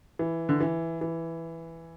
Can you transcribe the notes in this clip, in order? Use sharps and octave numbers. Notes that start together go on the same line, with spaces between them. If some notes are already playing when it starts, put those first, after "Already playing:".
E3
D3
E3
E3